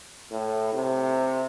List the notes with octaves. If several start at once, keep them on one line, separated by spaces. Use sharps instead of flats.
A2
C3